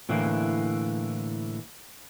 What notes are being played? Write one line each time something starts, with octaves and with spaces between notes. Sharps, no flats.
A2 D3 E3 A#3 E4